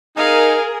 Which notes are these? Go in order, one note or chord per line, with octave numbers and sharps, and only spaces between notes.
D#4 G#4 A#4 F5 G#5